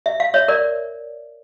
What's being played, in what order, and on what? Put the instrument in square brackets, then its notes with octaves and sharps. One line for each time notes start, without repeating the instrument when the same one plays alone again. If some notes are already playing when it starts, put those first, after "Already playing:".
[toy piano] E5
F5
C#5 E5
A#4 D5